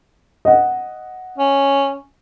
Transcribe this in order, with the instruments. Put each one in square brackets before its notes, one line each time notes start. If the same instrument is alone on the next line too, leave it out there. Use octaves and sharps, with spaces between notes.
[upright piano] D#5 F#5
[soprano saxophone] C#4